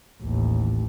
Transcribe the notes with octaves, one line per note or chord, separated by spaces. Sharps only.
A1 D#2